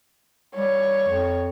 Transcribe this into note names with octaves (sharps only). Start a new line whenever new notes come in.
G3 C#5
F2